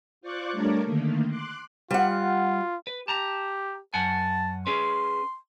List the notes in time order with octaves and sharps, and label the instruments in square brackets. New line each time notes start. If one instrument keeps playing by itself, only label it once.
[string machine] F4 C5 D5 C#6 D6 F#6
G3 A3 D4 A#4 C#5 D5
D3 D#3 A3 A#3
C6 D6 F#6
[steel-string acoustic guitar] G3 F#5 [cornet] F4
[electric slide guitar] B4
[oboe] G4 [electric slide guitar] A5 A#5
[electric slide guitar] F#2 F#5 G#5 [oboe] A5
[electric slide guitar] C#4 G#4 B4 [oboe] C6